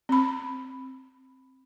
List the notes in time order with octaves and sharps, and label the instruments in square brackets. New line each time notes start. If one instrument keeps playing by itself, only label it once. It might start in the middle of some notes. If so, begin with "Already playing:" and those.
[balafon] C4 B5